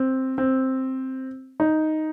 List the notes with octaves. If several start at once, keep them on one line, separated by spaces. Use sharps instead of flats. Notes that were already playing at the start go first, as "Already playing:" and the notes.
Already playing: C4
C4
D#4